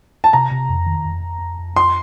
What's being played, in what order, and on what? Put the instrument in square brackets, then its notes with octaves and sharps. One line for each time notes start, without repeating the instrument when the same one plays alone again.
[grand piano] A5
[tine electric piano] C3 [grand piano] A#5
[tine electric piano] C3
F2
D#3
F2
F2
F2
F2
[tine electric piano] F2 [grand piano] C6